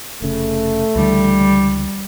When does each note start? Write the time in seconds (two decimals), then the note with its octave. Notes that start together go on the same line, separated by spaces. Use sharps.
0.22 F1 C#3 A3
0.96 C#2 D3 E3 G3